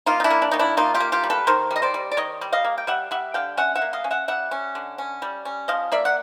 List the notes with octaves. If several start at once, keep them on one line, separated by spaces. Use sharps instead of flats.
A#3 D#4 F4
D#4
D4 E4
A#3
D4
D#3 D#4
D4 E4
A#3 D#4 F4
F4 G4
A#3
F4 G4
G3
A4 B4
D#3 A#4 C5
G3
D#5
C5 D5
G3
D5
D#3 C#5 D#5
G3
D#5 F5
A#3
G5
G3 E5 F#5
G3 E5 F#5
D3 F5 G5
C#4 E5 F#5
E5 F#5
A#3
D#5 F5
C#4
E5 F#5
G3 E5 F#5
C#4
D3
C#4
G3
C#4
F3 D#5 F5
A#3 D5 E5
F#5